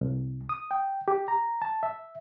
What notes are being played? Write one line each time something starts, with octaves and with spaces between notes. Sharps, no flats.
C2
D#6
G5
G4
A#5
A5
E5